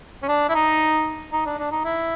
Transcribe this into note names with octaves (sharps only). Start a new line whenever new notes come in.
C#4
D4
E4
D#4
D#4
D4
D4
D#4
E4